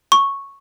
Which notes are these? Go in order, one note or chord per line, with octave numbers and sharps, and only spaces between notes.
C#6